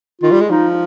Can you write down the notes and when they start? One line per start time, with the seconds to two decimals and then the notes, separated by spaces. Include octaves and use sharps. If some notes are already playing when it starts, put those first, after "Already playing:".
0.22 D#3 F4
0.31 G3
0.41 G#3
0.50 F3 D#4